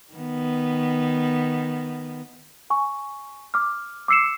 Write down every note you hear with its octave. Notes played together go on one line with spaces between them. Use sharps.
D#3 B3
G#5 C#6
D6 F6
D6 E6 C7 C#7 E7